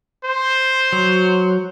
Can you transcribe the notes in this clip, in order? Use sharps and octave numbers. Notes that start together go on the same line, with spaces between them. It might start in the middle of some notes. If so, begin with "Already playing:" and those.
C5
F#3